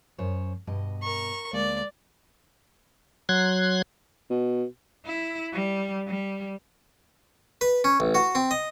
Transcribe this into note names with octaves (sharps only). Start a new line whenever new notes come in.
F#2 C5 C#5
G2 B2 D#5
A#4 C#6
D2 G#3 A#3 D5
F#3 C6 F#6 G#6
B2
E4
G3
G3
B4
C#4
A1
F#4
C4
D#5